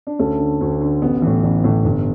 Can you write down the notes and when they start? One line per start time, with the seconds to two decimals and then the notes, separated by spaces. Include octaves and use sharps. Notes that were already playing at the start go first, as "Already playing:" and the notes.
0.07 D4
0.19 D2 A3 C#4
0.40 D3
0.61 D2
0.81 D3
1.02 A1 B3
1.22 A2 E3
1.44 A1
1.64 A2 E3
1.84 G1